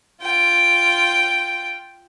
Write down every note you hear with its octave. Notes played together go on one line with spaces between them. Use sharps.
F4 G5